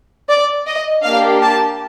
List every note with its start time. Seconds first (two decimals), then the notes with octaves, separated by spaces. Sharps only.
0.29 D5
0.67 D#5
1.04 A#3 D4 G4 F5
1.42 A5